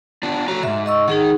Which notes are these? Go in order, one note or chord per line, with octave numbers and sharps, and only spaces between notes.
B3 D4 F4
A3 F#4 C#5 A#5
G#2 C#3 E5
D#5 C#6 E6
D#3 D#4 G#4 F#5